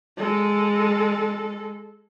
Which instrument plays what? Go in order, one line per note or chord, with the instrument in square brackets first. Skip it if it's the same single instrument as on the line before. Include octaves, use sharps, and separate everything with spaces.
[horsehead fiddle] G#3 A4